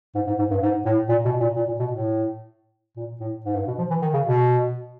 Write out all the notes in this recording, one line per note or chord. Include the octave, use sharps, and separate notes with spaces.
G#2
G#2
G#2
G2
G#2
A2
A#2
B2
A#2
A#2
A#2
B2
A2
A#2
A2
G#2
G2
B2
F3
E3
D#3
C#3
B2